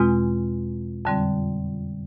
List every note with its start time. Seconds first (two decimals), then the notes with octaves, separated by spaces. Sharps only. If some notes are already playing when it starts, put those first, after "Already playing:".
Already playing: E2 B2 G#3 C4 F4
1.05 F2 D3 G3 C4